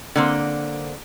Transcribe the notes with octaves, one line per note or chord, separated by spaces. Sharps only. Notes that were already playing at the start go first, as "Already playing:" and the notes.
D3 A#3 C4